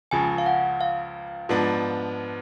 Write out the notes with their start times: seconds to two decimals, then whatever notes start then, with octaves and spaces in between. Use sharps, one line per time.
0.11 C#2 C#3 F3 G#5
0.38 F5
0.46 F#5
0.81 F5
1.49 G#2 F3 B3 D4